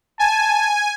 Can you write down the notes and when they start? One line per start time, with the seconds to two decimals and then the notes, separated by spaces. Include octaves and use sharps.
0.19 G#5 A5